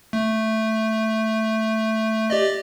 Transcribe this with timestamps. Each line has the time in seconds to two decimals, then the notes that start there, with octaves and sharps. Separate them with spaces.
0.13 A3
2.30 G4 D5 D#5